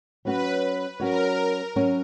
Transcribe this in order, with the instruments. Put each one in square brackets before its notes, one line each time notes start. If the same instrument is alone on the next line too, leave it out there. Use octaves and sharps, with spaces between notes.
[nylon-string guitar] F#3 C#4 F#4 C#5 [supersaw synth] B4
[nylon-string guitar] F#3 C#4 F#4 C#5 [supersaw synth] A#4
[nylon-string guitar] F#3 C#4 F#4 C#5